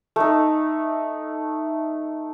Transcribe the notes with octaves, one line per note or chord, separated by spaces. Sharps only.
A3 D#4